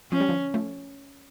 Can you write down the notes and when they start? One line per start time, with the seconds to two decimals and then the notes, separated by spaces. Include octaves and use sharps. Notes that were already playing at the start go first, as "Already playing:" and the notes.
0.12 F3 C#4
0.20 G3
0.29 D3 F3
0.54 F3 A3